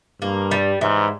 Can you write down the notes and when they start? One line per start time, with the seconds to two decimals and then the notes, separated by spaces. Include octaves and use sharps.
0.21 G2 A#3
0.51 G3
0.81 G#2 E3